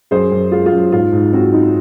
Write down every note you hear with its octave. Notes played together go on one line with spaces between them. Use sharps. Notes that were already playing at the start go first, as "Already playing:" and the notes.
F#2 G#4 C5
F#2
G#3 F4
F4
F#2
G#2 F4
G#2
C4 F#4
D#4